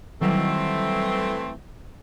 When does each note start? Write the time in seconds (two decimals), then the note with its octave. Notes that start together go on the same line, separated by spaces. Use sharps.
0.21 D#3 E3 F#3 G3 A3 C4